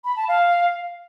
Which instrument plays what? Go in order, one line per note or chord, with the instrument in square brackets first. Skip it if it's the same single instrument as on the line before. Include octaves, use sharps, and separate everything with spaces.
[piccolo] B5
A5
F5